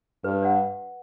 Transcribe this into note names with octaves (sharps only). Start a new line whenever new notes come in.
G2 B4
D5 F#5